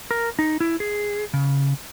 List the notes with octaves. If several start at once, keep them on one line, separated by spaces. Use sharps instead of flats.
A#4
D#4
E4
G#4
C#3